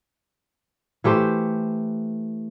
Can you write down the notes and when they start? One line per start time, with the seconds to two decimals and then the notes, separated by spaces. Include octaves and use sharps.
1.04 E3 A3 G4 C5